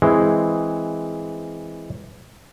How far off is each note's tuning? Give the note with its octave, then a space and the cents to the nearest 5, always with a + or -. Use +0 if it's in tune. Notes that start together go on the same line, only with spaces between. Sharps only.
E3 +0 G#3 +0 C4 +0